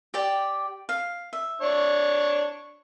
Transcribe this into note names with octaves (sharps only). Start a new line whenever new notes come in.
G4 D5 G5
F5
E5
D4 C#5